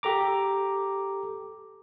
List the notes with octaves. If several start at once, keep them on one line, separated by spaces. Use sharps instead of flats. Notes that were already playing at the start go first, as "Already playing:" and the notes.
G4 A4 A#5 D6